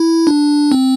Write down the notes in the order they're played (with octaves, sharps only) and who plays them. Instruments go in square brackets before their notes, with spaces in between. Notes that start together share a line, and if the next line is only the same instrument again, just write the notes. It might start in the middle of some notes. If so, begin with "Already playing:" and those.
Already playing: [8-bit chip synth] E4
D4
C4